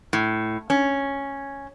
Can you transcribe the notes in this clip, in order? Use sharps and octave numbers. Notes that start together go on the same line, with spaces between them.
A2
C#4